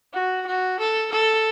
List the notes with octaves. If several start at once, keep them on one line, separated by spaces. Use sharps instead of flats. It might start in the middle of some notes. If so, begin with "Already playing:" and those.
F#4
F#4
A4
A4